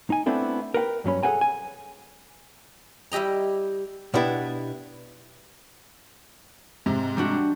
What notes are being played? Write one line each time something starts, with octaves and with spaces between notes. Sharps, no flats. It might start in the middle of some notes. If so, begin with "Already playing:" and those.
D#4 G#5
A3 B3 C4 D4 E4 A4
A#4 B4 F#5 G5
G2 F#3 C#4 B5
G#4 A4 B4 F#5 G#5 A#5
G#5
G3 E4 G4 D#5 A#5
B2 B3 D4 E4 G4 B4
G#2 C3
G3 D4 F#4